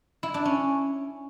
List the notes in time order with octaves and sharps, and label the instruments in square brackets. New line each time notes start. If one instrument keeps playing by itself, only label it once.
[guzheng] E4
D4
C#4